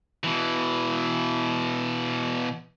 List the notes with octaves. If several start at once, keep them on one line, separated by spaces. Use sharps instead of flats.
B2 E3